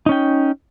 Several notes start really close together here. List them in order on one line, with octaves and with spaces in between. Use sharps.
D#4 C#4 G5